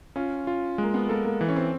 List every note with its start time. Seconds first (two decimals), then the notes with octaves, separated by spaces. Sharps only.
0.16 C#4 F4
0.47 F4
0.78 G#3 A#3
0.94 B3
1.09 A#3 A4
1.25 A#3
1.41 E3
1.48 C#4
1.56 C4